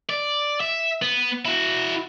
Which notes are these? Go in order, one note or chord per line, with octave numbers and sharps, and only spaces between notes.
D5
E5
B3
E4 F#4